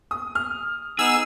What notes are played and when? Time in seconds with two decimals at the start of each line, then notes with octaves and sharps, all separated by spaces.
0.11 D#6
0.35 F6
0.99 B3 D#4 G#4 E6